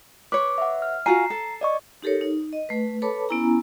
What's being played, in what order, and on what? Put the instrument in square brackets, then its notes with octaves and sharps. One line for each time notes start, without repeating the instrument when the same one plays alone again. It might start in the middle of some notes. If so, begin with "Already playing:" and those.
[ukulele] B4 C#5 [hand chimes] D6
[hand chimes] E5 F#5
F6
[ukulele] F4 F#4 G#5 [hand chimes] A#5 C7
[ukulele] A4
[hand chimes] D5 D#5 C#6
[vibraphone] D#4 G4 A4 A#4 C#5
D#4
D#5
A3 B4
A4 B4 C#5 A5 B5 D6
B3 C#4 E4 G#5 A#5